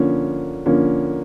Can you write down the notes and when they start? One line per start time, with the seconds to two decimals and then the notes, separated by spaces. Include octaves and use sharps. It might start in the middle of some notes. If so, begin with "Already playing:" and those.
Already playing: D3 F3 A#3 C#4
0.66 D3 F3 A#3 C#4